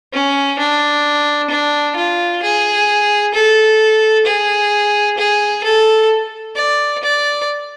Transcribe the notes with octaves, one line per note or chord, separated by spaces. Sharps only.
C#4
D4
D4
F4
G#4
A4
G#4
G#4
A4
D5
D5